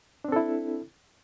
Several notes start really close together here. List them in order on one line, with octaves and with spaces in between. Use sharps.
D4 C4 A4 E4